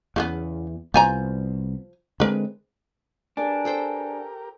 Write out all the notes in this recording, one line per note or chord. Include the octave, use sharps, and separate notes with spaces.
E2 C#3 F#3 B3
C2 F3 B3 G#5 A#5
D3 G#3 C4 A#4 B4
D4 G4 G#4 A#4 B4 G#5
A4 C5 G5